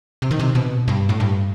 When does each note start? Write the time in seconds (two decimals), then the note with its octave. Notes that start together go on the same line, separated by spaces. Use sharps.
0.22 C3
0.31 D#3
0.40 C3
0.55 B2
0.88 G2
1.09 A2
1.20 G2